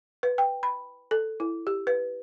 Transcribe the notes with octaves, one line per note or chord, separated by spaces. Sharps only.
B4
G5
B5
A4
E4
G4
B4